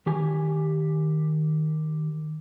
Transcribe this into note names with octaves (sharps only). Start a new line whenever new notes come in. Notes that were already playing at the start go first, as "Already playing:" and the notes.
D#3 G4 G#5